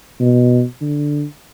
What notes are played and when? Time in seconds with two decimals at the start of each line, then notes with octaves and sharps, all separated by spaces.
0.21 B2
0.81 D3